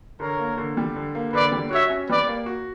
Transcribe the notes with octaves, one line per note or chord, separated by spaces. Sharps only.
D3 A#4 C#5
A#3
D3
G3
D3
A#3
D3 B4 D5
G3
F#4 C#5 E5
C#4
G3 B4 D5
A#3
F#4